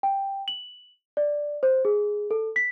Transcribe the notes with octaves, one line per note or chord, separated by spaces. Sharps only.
G5
F#7
D5
C5
G#4
A4
B6